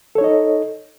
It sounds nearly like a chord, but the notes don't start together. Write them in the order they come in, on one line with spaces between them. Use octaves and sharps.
A4 C#5 D#4 D#5